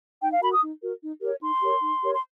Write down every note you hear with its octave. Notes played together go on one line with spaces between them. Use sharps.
D#4 G5
F5
F#4 A#4 B5
D#6
D#4
F#4 A#4
D#4
G4 A#4 C#5
D#4 C6
G4 A#4 C#5
D#4
G4 A#4 C#5
C6